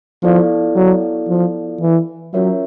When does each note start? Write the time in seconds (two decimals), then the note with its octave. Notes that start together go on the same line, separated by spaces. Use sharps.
0.23 F3 B3 E4 A4 D5 F5
0.76 F#3
1.29 F3
1.81 E3
2.33 F#3 C#4 F4 A#4 C#5 E5